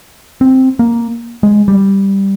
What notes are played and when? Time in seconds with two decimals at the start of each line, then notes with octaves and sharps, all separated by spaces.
0.41 C4
0.79 A#3
1.43 G#3
1.68 G3